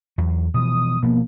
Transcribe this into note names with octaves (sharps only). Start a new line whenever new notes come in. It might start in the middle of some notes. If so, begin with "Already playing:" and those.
E2 F#3
B2 E3 F3 D#6
B2 F3 A#3 B3